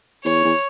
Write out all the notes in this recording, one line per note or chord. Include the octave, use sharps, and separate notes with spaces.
E2 C#5
E2